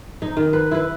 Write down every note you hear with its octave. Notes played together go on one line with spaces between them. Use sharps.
D#4
D#3
B4
E4 B4